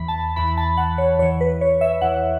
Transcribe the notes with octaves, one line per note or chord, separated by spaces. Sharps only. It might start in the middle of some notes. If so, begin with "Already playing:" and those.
Already playing: E2 E3 B5
A5
E2 E3 B5
B5
A5
F#5
C#5
E2 E3 C#5
B4
C#5
E5
E2 E3 F#5